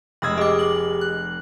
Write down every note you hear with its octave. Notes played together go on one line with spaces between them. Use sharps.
F1 G#3 B5 D#6 E6 G#6
G4 G#4 D#5 D6
F#7
F#6